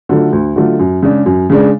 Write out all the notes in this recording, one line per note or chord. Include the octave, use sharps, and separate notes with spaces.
D3 F#3 A3 F4
D2
D3 F#3 A3 F4
F#2
C#3 G#3 D4
F#2
C#3 G#3 D4